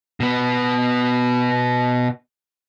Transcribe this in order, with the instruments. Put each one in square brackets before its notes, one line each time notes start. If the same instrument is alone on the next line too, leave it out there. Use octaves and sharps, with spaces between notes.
[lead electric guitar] B2 B3